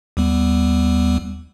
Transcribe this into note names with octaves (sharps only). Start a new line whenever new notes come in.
D#2 G3 B3